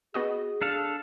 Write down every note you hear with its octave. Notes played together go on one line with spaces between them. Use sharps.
B3 F#4 G#4 D#5
D4 A4 F5